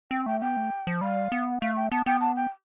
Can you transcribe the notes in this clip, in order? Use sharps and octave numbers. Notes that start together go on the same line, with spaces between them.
C4 G5
A3 G5
B3 G5
A3
F3
G3 F5
B3
A3 F5
G5
B3 A5
B3 G5
A5
G5